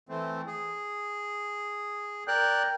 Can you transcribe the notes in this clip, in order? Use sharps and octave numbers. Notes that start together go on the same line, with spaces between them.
E3 A3 C4
G#4
A#4 D5 G5 F#6